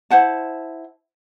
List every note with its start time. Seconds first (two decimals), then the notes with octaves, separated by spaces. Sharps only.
0.11 E4 C5 F#5 A5